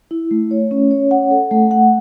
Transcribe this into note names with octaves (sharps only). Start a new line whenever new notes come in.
E4
A3
C#5
C#4
C#5
F#5
A4
A3
F#5